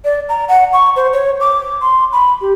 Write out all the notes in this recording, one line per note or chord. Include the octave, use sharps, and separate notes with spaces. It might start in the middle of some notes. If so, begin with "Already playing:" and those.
D5
A#5
F#5
C#6
C5
C#5
D6
C6
B5
G4